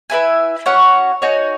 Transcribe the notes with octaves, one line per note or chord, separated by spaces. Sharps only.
E4 B4 E5 G#5
C#4 F#4 C#5 F#5
D#4 F#4 C#5 G#5